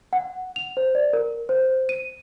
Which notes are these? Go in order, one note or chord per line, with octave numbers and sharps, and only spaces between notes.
F#5
F7
C5
D5
A#4
C5
D#7